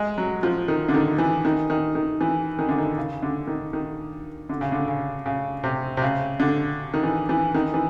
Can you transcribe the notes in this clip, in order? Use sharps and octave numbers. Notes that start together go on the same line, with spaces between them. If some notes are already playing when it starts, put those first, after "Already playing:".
Already playing: G#3
F#3
F3
D#3
D3
D#3
E3
D#3
D#3
D#3
E3
D#3
D3
D#3
C#3
D3
D#3
D#3
D3
C#3
D3
C#3
C#3
C3
C3
C#3
D3
D#3
E3
E3
D#3
E3